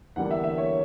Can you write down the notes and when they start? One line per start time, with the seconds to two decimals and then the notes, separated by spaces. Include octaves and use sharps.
0.16 E2 D3 G3 A#3 F#5
0.31 E5
0.44 E5
0.58 C#5